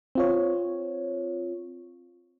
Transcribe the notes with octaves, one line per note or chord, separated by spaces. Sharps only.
C4 F4 C#5